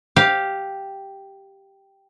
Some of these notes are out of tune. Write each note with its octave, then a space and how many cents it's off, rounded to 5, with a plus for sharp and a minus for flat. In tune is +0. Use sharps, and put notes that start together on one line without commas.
G4 +0 F5 +0